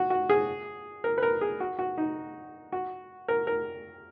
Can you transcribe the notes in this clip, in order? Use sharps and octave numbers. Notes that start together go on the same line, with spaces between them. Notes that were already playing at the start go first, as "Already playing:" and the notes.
Already playing: F#4
F#4
G#4
A#4
B4
A#4
G#4
F#4
F#4
D#4
F#4
A#4
A#4